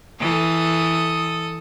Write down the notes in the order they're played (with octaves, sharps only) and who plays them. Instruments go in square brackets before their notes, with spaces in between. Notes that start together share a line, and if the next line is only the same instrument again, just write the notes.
[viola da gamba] E3 [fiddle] A4 D#6